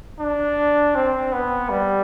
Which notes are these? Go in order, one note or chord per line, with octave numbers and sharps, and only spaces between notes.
D4
C4
B3
G3